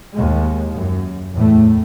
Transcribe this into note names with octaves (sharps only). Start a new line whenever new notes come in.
D#2 G#3
F#2
E2 A2 A3